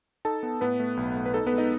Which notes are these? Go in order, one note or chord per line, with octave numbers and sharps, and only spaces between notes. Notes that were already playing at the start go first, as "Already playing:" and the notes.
D#4 A4 A5
B3
A2 B3 B4
A3
B1
A3
B4
D#4 A4
B3 B4
G#3
D#4 D#5